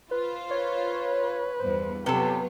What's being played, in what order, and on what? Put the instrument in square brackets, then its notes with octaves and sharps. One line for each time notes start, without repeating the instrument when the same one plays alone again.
[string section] F4 C5 [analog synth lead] B4
[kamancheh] B4 [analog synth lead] C#5
[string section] E2 G2 [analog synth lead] C5
[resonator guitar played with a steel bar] C3 A4 [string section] F#3 B3 F4 [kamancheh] G4 [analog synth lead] B4